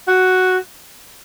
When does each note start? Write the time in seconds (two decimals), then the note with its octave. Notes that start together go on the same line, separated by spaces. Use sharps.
0.08 F#4